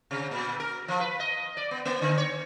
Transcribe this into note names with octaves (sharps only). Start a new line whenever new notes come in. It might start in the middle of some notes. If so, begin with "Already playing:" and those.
C3
A#2
A#4
F3
B4
D#5
D5
B3
A#3
D3
C#5